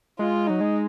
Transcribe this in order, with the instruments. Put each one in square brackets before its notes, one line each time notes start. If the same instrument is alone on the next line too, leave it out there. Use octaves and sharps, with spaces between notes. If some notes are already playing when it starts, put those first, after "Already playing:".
[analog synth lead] G#3 [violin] F4
[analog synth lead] F#3 [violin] D#4
[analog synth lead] G#3